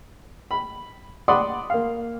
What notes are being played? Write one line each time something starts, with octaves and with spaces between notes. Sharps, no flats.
B5
D5 F#5 B5 C6 D#6
A#3 F5